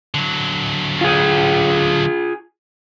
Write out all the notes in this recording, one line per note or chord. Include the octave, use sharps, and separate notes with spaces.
D3 F#3
F4 G#4